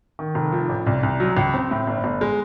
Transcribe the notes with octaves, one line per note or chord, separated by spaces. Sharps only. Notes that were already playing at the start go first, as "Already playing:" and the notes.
D#3
F1
F3
A1
C2
C2
F#3
C#2
C4
A2
G1
G1
G#3